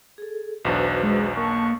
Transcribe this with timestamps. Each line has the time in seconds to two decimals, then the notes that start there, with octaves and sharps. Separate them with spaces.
0.18 G#4 A4
0.65 B1 E2 D4 F#4 B4 C5
1.03 G#3
1.37 A#3 A5 C#6